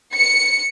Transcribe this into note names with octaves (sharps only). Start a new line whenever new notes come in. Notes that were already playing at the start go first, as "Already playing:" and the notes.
C#7